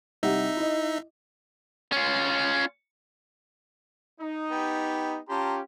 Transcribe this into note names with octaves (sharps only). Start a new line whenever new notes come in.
C2 D#4 G4 E5 F#5
E4 D#5
C#4 F4
D#4
B3 G4 G5
C#4 F4 G4 A5 A#5 C6